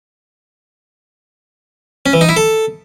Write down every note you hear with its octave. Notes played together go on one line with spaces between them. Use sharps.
C#4
E3
D#4
E4
A4